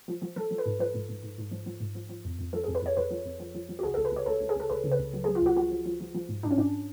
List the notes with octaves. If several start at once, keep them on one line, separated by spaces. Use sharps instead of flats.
F3
F3
F3 A4
F3
B4
G#2
F3 B4
G#2
G#2
G#2
G#2
F3
F3
G#2
F3
F3
F2
F2
F3 A4
G#4
F2
B4
F2 C#5
F2 B4
F3
F2
F3
F3
F3
F#4
C#2 G#4
A4
C#2
B4
C#2 C#5
C#2 A4
C#2
G#4
C#2 A4
C#2 B4
C#3
B4
C#2
F#3
G#4
F#3
F4
C#2 F#4
F3 F#4
F3
F3
F3
F3
G#2
G#2 D4
C#4
G#2 D4